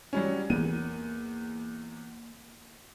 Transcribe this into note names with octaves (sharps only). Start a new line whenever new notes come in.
F#3 G3 C#4
E2 A#3 D#7